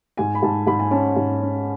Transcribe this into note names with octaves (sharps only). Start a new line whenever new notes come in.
G#2 G#5
B5
G#2 A5
G#2 B5
G#5
C#4 A5
G#2
C#4